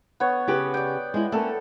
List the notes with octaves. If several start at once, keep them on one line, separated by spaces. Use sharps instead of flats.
B3 C#5
C#3 G4 B4
D5 G5
G#3 E4
A3 A#3 C#4 A4